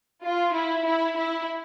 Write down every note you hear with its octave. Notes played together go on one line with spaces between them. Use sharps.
F4
E4
E4
E4